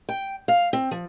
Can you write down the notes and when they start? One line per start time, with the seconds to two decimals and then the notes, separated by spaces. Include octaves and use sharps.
0.09 G5
0.48 F5
0.73 C4
0.91 F3